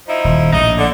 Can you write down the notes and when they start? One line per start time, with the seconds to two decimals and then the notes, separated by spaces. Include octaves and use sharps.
0.08 F3 D#4 E4
0.24 D#1
0.53 A#1 A2 D#4
0.77 D3